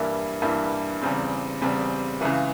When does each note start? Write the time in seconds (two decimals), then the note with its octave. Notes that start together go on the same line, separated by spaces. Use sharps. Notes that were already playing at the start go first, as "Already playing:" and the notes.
Already playing: G2 E3 G3 A#3 E4
0.42 G2 E3 G3 A#3 E4
1.02 E2 C#3 G3 C4
1.62 E2 C#3 G3 C4
2.21 C#2 C#3 E3